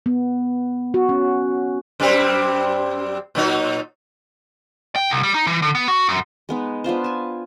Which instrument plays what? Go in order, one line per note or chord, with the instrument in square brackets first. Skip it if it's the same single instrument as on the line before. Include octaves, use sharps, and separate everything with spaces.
[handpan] B3
F#4
C#4
[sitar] F#2 G3 C4
A#2 F#3 D#4
[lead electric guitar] G5
C2
G3
D#4
E3
D3
B3
F#4
F#2
[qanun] G#3 B3 D#4
B3 D4 F4 C5
G#5 A5